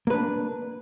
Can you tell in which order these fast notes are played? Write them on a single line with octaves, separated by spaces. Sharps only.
A#3 B4 D4